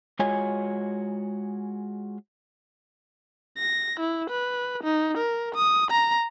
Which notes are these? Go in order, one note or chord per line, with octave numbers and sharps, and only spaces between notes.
G#3 F4 F#4 C#5 D#5 G#5
A#6
E4
B4
D#4
A#4
D#6
A#5